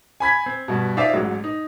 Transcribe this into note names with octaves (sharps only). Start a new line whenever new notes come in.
G#5 B5 G#6 B6
C4
G2 B2
D#4 F4 C5 D5 E5 F5
A1 G#2 F#3
D#4